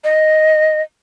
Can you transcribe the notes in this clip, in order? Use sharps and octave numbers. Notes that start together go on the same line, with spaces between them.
D#5